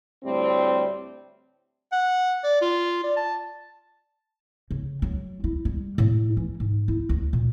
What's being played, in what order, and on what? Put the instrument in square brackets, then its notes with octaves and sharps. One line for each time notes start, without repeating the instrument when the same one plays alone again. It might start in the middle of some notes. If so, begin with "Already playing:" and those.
[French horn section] D2 A2 G3 C4
[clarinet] F#5
D5
F4
D5
A5
[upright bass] C#3
F#3
E4
G3
A2
E3
G#2
E4
D2
A#2